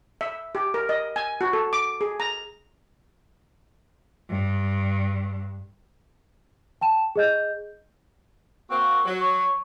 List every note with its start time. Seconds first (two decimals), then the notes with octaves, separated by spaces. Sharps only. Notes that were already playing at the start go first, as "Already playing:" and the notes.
0.21 E5
0.55 G4
0.74 A#4
0.89 D#5
1.16 G#5
1.41 F#4
1.53 A4
1.73 D6
2.01 G#4
2.20 A#5
4.30 G2
6.81 G5 A5 E7
7.16 G#4 D#5 G6
8.70 A#3 C4 F#4
9.05 F#3
9.20 C#5